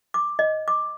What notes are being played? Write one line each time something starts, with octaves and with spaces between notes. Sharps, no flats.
D6
D#5
D6